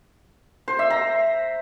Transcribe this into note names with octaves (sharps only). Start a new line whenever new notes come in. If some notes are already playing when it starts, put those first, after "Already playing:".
C5
E5
A#5